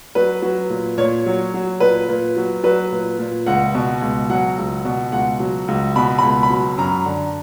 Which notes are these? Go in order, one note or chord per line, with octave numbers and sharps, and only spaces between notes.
F#3 B4
F#3
A#2
A#2 C#5
F#3
F#3
A#2 B4
A#2
F#3
F#3 B4
A#2
A#2
C#2 F#5
B2
C#2
F#3 F#5
C#2
B2
C#2 F#5
F#3
C#2
B2 B5
C#2 B5
B5
F#3
F#2 A#5
D3